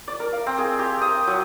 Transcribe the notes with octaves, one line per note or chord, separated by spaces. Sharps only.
D5
A#4
F5
C4
G#4
G4
D#6
F#3